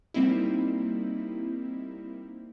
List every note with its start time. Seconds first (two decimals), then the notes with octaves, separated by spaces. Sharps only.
0.14 G3 A#3 C4 D#4 E4